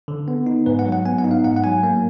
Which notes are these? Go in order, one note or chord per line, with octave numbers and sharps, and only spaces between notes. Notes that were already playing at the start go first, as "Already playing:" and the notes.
D3
B3
D#4
G#2 B4
F#5
F#3
F#5
B3 G#5
F#5
D#4
F5
G#2 F#5
F#5
F#3 G#5
A#3